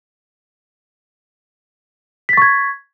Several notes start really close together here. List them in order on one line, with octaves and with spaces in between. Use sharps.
B6 A6 C#6 G#6